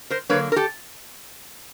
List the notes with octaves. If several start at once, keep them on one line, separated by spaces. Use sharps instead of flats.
A#4 C5
D3 F#3 A#3 B4 C#5
A#4
G4 A4